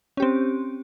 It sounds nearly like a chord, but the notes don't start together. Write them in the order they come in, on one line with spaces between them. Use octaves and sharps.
C#4 G4 C4